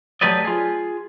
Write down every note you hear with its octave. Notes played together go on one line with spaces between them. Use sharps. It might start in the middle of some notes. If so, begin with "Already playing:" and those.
F#3 A3 G4 B4 D5 D#5
F4 G#4